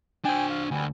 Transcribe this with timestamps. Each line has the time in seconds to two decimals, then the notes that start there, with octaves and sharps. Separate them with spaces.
0.25 D4 C5 G5 G#5
0.50 F5
0.71 D2 G3 B3 G#5